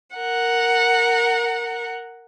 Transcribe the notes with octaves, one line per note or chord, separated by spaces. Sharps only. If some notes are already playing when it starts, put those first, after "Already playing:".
A#4 F#5